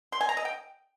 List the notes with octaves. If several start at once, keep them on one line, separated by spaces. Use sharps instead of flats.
C6
G#5
A#5
D#5
G5